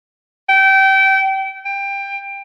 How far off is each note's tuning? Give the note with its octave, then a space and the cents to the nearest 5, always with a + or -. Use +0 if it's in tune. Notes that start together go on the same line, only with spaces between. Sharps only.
G5 -25
G5 +20